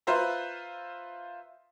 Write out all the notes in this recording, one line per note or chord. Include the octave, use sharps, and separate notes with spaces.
F4 B4 C5 E5 A#5